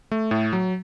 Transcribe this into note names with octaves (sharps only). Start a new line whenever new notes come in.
A3
A2
F#3